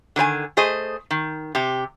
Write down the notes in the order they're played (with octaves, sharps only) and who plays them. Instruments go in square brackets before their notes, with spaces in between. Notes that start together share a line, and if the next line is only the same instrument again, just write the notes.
[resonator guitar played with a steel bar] D3 D#3 C5 G#5
A3 G#4 C5 D#5
D#3
C3 G4